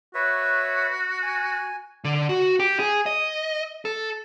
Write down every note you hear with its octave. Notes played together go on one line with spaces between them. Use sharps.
F#4 B4 C#5 E5
G#5
D3
F#4
G4
G#4
D#5
A4